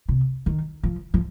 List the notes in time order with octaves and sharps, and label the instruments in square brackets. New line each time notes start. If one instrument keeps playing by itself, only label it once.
[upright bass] C3
D#3
F3
F3